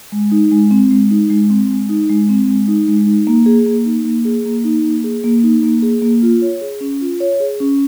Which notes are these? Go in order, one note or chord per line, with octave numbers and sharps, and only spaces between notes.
G#3
D#4
G#3
C4
G#3
D#4
G#3
C4
G#3
D#4
G#3
C4
G#3
D#4
G#3
D#4
A#3
G#4
A#3
D#4
A#3
G#4
A#3
D#4
A#3
G#4
A#3
D#4
A#3
G#4
A#3
F4
C#5
G#4
C#4
F4
C#5
G#4
C#4